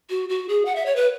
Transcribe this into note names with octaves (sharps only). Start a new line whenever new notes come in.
F#4
F#4
G#4
F#5
E5
C#5
B4